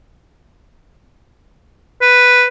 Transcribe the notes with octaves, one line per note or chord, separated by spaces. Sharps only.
B4